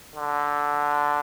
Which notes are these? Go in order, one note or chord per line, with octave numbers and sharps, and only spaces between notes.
D3